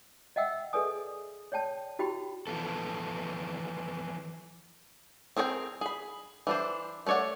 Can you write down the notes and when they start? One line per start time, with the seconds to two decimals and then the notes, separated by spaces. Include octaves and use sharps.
0.36 D#5 E5 F#5 G5 E6
0.73 G#4 A4 B4 D5 G#5 D#6
1.52 C#5 D5 G5 A5
1.99 E4 F#4 G4 G5 B5
2.47 E3 F3 B3 A4
5.37 C4 G#4 A#4 C#5 G5
5.81 G#4 B5
6.47 E3 D4 C5
7.06 A3 A#4 C#5 D5 F#5